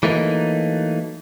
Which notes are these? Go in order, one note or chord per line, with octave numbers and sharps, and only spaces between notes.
E3 F#3 A3 A#3 D#4